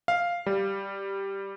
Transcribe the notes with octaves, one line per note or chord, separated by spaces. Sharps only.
F5
G3